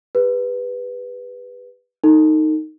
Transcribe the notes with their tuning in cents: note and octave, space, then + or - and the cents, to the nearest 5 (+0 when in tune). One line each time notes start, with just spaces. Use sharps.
G4 +35 B4 +0
D#4 +0 A4 +35